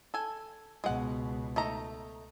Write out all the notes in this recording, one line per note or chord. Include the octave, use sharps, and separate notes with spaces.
A4 G#5
C#2 B2 G#3 F#5
A3 D#4 A#5